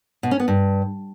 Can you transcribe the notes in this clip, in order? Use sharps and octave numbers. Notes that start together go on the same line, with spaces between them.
B2
C#4
B3
G2